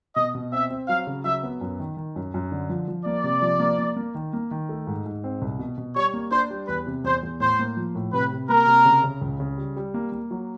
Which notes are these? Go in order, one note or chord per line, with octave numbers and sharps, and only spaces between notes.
B2 D#5
B2
C4 E5
C4
F#3 F5
C#3
F#3 E5
B3
F#2
D#3
D#3
F#2
F#2
D3
F3
F3
A#3 D5
C3
F3
A#3
A#3
A#3
D#3
A#3
D#3
A3
G#2
G#2
C4
C2
B2
B2
G3 C#5
A#3
D4 C5
G3
E2 B4
C3
E2 C5
E2
A2 C5
A#3
F3
A2
C3 B4
C3
A#3 A#4
C3
C#3
C#3
C#2
C#3
G3
G3
A#3
A#3
F#3